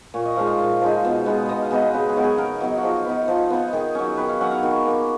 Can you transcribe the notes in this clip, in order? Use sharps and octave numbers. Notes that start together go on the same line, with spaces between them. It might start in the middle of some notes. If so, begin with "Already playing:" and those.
A#2 C#5
D#5
F3 G#3 D#4 F5
F5
A#2 F5
F3 G#3 D#4
B2
G#3 B3 D#4
B2 D#5
F5
G#3 B3 D#4 D#5
C#3 B4
G#4
F#3 B3 D#4 A#4
G#4
C#3 A#4
F#3 B3 D#4
F#4
F3 G#4
B3 D#4
F3
B3 D#4
D#3 G#4
F#3 C#4
D#3 B4
F5
F#3 C#4 F#5
F5
D#3 F#4
A#3 C#4